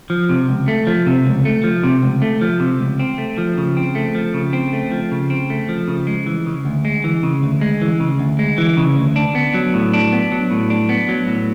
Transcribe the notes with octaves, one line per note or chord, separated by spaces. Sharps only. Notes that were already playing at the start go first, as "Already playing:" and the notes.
F3
C3
C#2
A3
F3
C3
C#2
A3
F3
C3
C#2
A3
F3
C3
C#2
C4
A3
F3
C#3
C4
A3
F3
C#3
C4
A3
F3
C#3
C4
A3
F3
C#3
G#3
E3
C#3
D2
G#3
E3
C#3
D2
G#3
E3
C#3
D2
G#3
E3
C#3
D2
D4
B3
F#3
A2
D4
B3
F#3
A2
D4
B3
F#3
A2